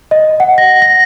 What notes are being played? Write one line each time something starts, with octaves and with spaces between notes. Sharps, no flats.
D#5
F#5
A#6
A#6